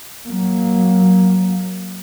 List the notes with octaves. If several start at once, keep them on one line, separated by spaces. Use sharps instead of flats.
F#3 A#3